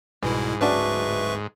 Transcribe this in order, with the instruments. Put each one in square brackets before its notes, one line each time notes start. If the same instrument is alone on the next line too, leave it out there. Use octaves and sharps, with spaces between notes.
[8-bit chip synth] C2 B2 E4 [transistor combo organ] G#2 [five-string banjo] E3
[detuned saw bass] D1 [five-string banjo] C#4 D4 F#4 [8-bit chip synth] B4 E5 C#6